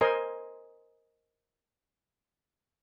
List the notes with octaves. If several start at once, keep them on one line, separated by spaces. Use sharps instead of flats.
A#4 C5 D#5 G#5 C6